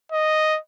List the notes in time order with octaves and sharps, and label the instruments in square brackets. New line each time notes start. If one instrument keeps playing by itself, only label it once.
[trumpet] D#5